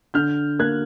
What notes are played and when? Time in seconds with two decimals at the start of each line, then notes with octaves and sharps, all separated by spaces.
0.14 D3 F6 G6
0.59 A#3 F#6 G#6